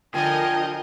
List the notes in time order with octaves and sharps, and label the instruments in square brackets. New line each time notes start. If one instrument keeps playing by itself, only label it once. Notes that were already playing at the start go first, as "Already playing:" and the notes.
[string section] D3 A#4 D#5 [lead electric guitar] F3 [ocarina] G5 [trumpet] G#5